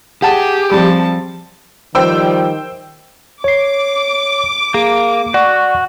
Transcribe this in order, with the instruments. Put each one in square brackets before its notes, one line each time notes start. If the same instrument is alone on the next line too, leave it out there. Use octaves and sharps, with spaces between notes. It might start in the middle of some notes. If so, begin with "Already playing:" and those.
[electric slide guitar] G4 [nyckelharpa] G#4 [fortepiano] F#5 A5
[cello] F3 [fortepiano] G3 C4 [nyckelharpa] A5
[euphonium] D#3 [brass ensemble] F3 G3 [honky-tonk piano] C5 G5 E6
[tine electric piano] C#5 C7 [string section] D6
[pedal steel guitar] A#3 [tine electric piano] G#4
[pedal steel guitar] F#4 [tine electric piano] D5 F#5 C#6